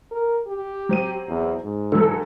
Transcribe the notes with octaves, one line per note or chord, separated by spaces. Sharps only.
A#4
G4
F#3 C4 D#7
E2
G#2
D3 E3 F#3 A4